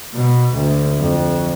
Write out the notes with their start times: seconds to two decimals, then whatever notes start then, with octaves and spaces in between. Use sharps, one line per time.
0.14 B2
0.54 D2
0.99 F2